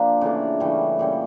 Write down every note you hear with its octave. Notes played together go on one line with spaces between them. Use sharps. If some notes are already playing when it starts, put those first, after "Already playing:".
Already playing: F3 A#3 D4 G4
C#3 E3 A3 D4
C#3 E3 G3 C#4
A#2 G3 C#4